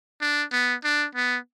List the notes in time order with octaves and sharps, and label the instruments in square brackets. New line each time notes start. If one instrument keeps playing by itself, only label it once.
[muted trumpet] D4
B3
D4
B3